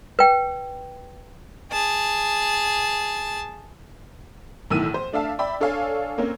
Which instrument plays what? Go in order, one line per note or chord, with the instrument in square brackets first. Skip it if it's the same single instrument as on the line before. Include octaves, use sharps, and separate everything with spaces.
[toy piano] B4 G5
[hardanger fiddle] G#4 A5
[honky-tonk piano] B1 A2 D#3 E3 E6 D#7
C5
A3 D4 E5 F5 A5
D5 E5 G5 B5
D4 A4 C#5 F5 G#5
A#3 C4 C#4